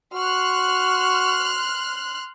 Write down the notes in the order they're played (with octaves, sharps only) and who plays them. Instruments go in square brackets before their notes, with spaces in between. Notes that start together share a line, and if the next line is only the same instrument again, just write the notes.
[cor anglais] F#4 [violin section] C6 F6 F#6